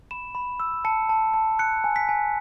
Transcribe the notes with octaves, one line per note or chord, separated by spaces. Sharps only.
B5 E7
B5
E6
A5 C#7
A5
A5
F#6 C#7
G#5
B6
G#5